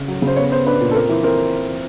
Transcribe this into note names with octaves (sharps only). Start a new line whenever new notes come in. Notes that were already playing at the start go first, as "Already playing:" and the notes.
Already playing: C#3
F#3
C#3
C5
B3 C#5
B3 C5
D4 B4
A#2
A4
C4 A#4
E3
C4 A#4